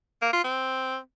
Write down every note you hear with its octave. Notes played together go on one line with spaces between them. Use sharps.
A#3
F4
C4